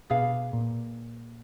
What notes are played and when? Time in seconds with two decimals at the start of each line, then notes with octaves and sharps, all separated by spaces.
0.10 B2 D4 G#4 B4 F5
0.53 A#2